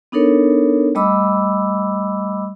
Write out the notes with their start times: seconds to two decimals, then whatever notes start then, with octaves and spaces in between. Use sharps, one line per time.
0.12 B3 D4 D#4 A4 A#4 C#5
0.95 G3 A3 D#5 B5 D6 E6